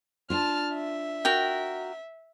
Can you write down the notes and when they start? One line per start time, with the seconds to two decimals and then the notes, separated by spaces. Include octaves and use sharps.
0.30 D4 F4 A5 F6
0.74 E5
1.25 F#4 A#4 G5